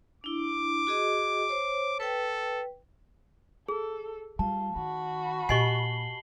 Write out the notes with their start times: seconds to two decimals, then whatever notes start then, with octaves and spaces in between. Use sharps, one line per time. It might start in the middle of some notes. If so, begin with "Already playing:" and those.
0.24 D4 E4 D6
0.87 F#4 G#4 D#5
1.49 C5 C#5
2.00 A4 B4 G5
3.68 G#4 A4
4.39 G3 F4 A5
4.76 D#3 F#4 B5
5.49 A#2 G4 D#5 G#5 C7 F#7 G7